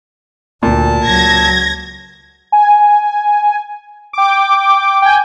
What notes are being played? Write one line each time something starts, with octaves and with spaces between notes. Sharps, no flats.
D2 A#2 A3 A5
C#2 F#3 G#6 A#6
G#5
G5 D6
G5 G#5